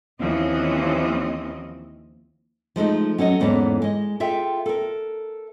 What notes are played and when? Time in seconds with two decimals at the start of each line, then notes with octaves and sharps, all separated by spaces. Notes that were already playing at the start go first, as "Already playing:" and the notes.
0.20 D#2 E3 F3 C4 C#4 D#5
2.76 F3 G#3 A3 D#4
3.18 F#3 C#4 A4 D#5
3.40 E2 G#2 A#3 C#4 A4 B4
3.82 G#3 D#5
4.20 F4 G#4 A4 E5 F5 G5
4.66 A4 A#4